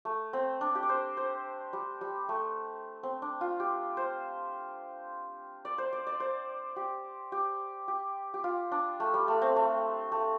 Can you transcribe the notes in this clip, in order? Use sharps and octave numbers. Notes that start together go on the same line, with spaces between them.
A3
C4
D4
G4
D5
C5
C5
G3
G3
A3
C4
D4
F4
G4
C5
D5
C5
D5
D5
C5
G4
G4
G4
G4
F4
D4
A3
G3
A3
C4
A3
A3